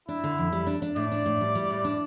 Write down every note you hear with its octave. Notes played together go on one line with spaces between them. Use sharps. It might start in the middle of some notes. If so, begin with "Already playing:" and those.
D4 E4
D3
F2
G3
D4
D4
A2 D5
D4
A2
G3
G3
A2
D4